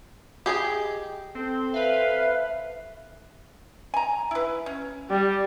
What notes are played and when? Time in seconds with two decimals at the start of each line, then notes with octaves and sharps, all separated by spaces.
0.46 G4 G#4 D#5 G5
1.35 C4 A4 C5
1.74 B4 E5 F5
3.94 G#5 A#5
4.31 E4 B4
4.66 C#4
5.10 G3